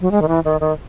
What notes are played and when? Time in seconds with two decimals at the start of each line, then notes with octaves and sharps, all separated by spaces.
0.01 F#3
0.11 G#3
0.22 D#3
0.28 E3
0.45 D#3
0.61 D#3